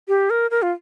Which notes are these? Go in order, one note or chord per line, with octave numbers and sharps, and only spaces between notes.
G4
A#4
A#4
F4